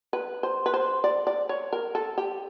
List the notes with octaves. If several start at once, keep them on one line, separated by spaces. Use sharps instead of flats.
B4
C5
B4
C5
D5
D5
C#5
A#4
A4
G4